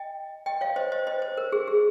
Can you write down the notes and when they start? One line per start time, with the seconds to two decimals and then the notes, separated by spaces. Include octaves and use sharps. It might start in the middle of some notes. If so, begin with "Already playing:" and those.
Already playing: D#5 G5
0.46 D#5 G5
0.61 C#5 F5
0.76 C5 D#5
0.92 C5 D#5
1.07 C5 D#5
1.22 C5
1.37 A#4
1.52 G#4
1.68 G#4